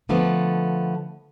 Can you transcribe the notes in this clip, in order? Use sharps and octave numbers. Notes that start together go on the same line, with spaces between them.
D3 F3 A3 B3